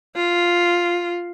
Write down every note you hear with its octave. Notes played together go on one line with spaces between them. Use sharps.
F4